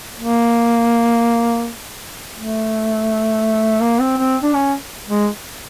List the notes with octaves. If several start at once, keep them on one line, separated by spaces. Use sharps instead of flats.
A#3
A3
A#3
C4
C4
D4
C#4
G#3